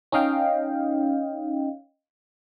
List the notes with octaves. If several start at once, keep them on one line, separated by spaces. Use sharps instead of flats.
C#4 D#4 D#5 F5 G5